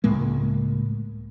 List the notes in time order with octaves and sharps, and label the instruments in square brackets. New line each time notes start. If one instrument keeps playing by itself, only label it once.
[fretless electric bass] C#2 A2 G#3 A#3